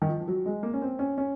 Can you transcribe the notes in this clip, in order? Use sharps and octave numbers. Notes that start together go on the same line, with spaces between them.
D#3
F3
F3
F#3
G#3
A#3
C#4
C4
C#4
C#4